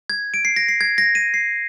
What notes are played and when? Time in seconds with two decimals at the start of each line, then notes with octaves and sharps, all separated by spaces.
0.10 G#6
0.34 D7
0.45 C7
0.56 A#6
0.68 C7
0.81 G#6
0.98 A#6
1.15 D#7
1.34 C7